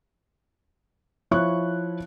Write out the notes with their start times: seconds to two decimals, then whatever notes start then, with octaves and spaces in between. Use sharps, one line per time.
1.31 F3 E4 C#5 C#6 F#6